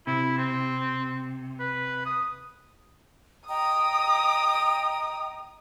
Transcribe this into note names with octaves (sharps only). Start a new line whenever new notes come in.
C3 E4
C4
B4
D#6
D#5 G5 A#5 D#6